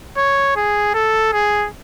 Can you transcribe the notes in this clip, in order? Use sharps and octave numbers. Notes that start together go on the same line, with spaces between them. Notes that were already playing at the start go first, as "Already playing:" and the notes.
C#5
G#4
A4
G#4